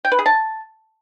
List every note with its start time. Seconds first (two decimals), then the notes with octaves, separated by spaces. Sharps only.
0.05 G5
0.12 B4
0.19 G#4
0.26 A5